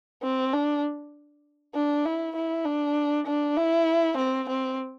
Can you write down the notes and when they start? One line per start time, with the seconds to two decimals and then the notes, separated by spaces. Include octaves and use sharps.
0.22 C4
0.53 D4
1.75 D4
2.05 E4
2.36 E4
2.65 D4
3.26 D4
3.57 E4
4.17 C4
4.49 C4